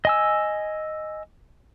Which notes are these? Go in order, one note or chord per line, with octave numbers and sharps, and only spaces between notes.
D#5 G#5 E6